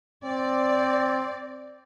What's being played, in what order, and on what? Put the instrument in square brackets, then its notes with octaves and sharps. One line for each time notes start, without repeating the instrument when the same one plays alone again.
[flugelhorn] C4 [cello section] D5